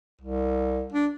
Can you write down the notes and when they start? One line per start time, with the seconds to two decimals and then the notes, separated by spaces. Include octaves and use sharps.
0.21 C2
0.92 D4